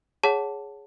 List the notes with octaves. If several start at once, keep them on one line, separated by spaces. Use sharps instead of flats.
G#4 C#5 F#5 A5